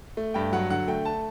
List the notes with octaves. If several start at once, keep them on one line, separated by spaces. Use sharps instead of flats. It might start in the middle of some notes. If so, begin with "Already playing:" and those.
A3
G2 G5
F#3 F#5
D3 F#5
A3 G5
A5